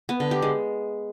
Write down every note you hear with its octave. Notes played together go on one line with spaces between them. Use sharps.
B3
D3
G4
G#3